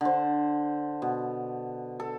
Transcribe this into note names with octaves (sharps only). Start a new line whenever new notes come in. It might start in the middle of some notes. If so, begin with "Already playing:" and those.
D3 C5
B2
A4